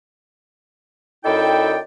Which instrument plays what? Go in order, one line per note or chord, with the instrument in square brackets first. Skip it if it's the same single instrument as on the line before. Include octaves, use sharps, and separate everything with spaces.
[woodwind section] F#2 D#4 E4 A4 D5 G5